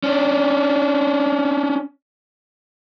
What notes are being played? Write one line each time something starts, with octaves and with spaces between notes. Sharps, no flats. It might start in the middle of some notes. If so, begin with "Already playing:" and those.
C#4 D4